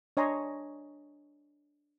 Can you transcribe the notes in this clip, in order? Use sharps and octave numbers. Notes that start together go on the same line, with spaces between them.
D4 C#5 D#5 G#5 A#5 C6